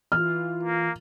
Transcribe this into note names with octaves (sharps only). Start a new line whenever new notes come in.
E3 F4 F6
A#3